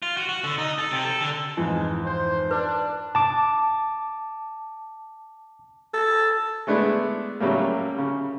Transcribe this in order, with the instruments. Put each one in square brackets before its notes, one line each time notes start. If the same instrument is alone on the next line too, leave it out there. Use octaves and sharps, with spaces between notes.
[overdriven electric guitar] F4
F#4
F#4
D3
D#4
A4
C3
A4
D3
[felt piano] F2 G#2 E3 [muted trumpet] G#3 [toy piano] E4
[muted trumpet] C5
[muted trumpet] D4 [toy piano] B4
[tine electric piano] A5 D6
[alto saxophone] A4
[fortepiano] G#3 A3 B3 D4 E4
C#3 F#3 G3 A3 A#3
C#3